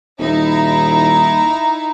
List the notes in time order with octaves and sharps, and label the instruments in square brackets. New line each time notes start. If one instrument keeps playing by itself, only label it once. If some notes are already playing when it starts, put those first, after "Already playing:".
[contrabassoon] D#1 [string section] D#4 E4
[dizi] A#5